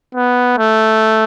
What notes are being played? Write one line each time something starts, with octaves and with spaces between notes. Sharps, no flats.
B3
A3